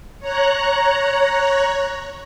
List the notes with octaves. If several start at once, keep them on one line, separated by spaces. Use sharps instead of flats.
C#5 A#5 F#6